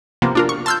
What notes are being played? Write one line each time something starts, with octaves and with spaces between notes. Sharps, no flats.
C3 F3 A#3 B3
D4 F4 A#4
C#6
A5 C6 E6 F6 G6